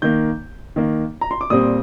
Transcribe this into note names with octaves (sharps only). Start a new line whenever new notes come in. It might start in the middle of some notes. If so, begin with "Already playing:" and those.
D#3 A#3 G6
D#3 A#3
A#5
C6
D6
A#2 G3 C4 D#6